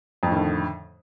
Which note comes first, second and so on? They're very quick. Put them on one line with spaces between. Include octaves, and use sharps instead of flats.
F2 A2 D#3 D3